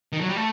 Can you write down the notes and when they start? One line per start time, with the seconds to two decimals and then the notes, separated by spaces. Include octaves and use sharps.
0.13 D#3
0.21 F#3
0.29 G3
0.36 A3